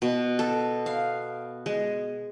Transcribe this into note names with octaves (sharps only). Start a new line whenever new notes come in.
B2
A4
F5
G#3